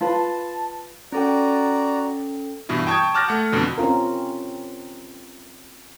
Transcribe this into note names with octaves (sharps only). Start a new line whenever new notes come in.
F4 B4 A5
C#4 F#4 A4 D5 G5 A#5
G2 B2 E3 E4
G5 A5 C#6 D#6 G6 G#6
A5 D6 F6 F#6 A6 A#6
A3 F#5
F2 B2 D3
C4 C#4 F4 A#4